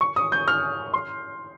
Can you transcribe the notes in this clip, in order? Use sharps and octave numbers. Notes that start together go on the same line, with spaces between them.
C#6
D#6
G6
F6
C6